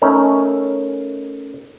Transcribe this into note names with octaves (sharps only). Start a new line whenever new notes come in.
A3 C#4 D#4 A#4